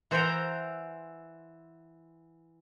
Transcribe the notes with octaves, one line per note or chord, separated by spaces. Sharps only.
E3 C5 E5 F#5 G5 A#5